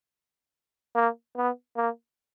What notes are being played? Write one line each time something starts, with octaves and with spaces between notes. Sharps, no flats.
A#3
B3
A#3